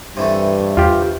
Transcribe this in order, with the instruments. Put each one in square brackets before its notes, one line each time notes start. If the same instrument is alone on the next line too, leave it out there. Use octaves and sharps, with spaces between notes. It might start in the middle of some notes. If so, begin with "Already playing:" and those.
[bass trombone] G2 [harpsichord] C3 E3 A3
[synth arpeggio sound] E2 [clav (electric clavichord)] F4 G4